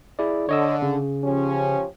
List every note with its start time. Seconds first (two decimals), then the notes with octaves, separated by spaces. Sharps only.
0.19 E4 G#4 D5
0.49 D3 C#5 D#5 E6
0.82 C#3
1.24 F3 C#4 G4